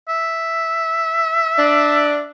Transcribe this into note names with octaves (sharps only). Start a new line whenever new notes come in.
E5
D4